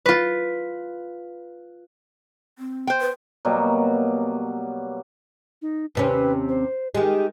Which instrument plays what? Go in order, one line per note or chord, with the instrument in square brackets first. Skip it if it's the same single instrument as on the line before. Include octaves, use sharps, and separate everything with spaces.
[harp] F4 B4
[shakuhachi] C4
[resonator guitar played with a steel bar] C5 G5
[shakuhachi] B4
[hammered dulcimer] B2 F#3 G3 A#3
[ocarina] D#4
[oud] D#2 C3 C#4 [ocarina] B4
[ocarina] C5
[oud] D#3 G#3 [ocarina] G4